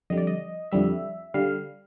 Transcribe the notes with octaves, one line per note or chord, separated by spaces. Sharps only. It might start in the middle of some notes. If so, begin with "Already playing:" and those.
F2 D3 G3 D#5
D5
D#5
F2 D3 G3 E5
D3 G3 F5